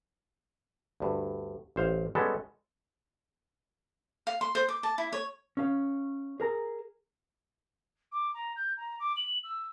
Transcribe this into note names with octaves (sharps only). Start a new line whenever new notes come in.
D2 G2
A1 C5 F5
G3 G#3 B3 C#4 A4
F5
C6
C5
D6
A5
E4
C#5
C#4 F5
G#4 A#4 A#5
D6
A#5
G6
A#5
D6
F#7
E6